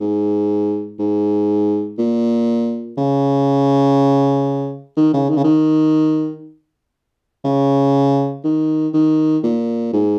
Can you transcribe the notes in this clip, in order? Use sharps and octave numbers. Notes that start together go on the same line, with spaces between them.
G#2
G#2
A#2
C#3
D#3
C#3
D#3
C#3
D#3
C#3
D#3
D#3
A#2
G#2